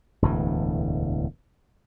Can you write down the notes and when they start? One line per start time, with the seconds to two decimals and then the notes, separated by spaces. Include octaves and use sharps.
0.22 E1 D2 A2 E3